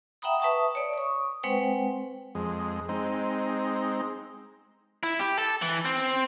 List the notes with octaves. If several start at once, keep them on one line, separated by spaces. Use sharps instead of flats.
E5 F#5 G5 A#5 B5 D#6
B4 E5 A5 C#6 D#6
C#5 D5
C#6 D#6
G#3 C4 B4 C5 F#5 G5
F2 G#3
G#3 C4 D#4
E4
G4
A4
E3
C4